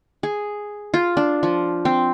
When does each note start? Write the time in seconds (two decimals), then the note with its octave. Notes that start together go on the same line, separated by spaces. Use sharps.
0.23 G#4
0.94 F4
1.17 D4
1.43 F3
1.85 C4